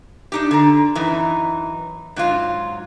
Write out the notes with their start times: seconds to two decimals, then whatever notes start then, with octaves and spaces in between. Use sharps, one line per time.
0.32 D4 D#4 G4
0.51 D3 A#5
0.95 F#2 E3 D#4
2.16 G#2 F#3 F4